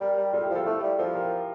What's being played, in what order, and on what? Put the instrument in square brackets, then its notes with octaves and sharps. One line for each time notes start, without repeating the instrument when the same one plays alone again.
[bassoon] G3 [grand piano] G4 A#4
[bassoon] G3
[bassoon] G3 [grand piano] F4 A4
[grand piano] E4 G4
[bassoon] F3
[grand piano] F4 A4
[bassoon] A3 [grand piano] E4 G4
[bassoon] G3
[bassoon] F3 [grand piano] F4 A4
[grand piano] G4 A#4